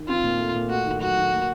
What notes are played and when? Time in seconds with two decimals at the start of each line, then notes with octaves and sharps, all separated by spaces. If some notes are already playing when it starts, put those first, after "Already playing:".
Already playing: D#3
0.08 C4 F4
0.24 A#2
0.39 A3
0.55 A#2
0.69 A3 F#4
0.85 D#3
1.01 F#3 F#4
1.16 D#3
1.31 A#3